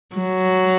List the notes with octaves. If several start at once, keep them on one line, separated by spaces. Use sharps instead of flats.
F#3